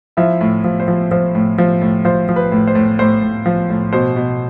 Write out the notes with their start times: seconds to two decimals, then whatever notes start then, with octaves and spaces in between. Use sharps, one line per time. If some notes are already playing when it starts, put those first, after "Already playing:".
0.17 F3 E4 E5
0.41 A2
0.64 F3
0.80 C5
0.88 F3
1.11 F3 C5
1.35 A2
1.58 F3
1.82 A2
2.05 F3 C5
2.29 F3
2.36 B4
2.52 A2
2.67 C5
2.75 A2
2.99 A2 C5
3.22 A2
3.46 F3
3.70 A2
3.93 B2 C5
4.16 B2